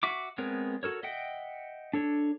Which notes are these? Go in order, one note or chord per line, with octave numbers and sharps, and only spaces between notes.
F#4 E5 C#6 D6
G#3 B3 C4 A#4 C#5
F#4 A4 A#4 C#5
D#5 E5 F#5 G5
D4 A4 C#5